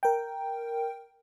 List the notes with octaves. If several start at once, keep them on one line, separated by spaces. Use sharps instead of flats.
A#4 G5